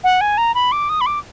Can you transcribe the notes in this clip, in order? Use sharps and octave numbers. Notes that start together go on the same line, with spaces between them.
F#5
G#5
A#5
B5
D6
D#6
B5
D6